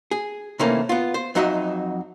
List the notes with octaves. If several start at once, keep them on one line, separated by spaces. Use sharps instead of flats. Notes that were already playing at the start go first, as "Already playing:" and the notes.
G#4
C3 D#3 E3 A3 A#3 C#4
B3 F4
C5
F2 F#3 D#4 F#4 D#5 E5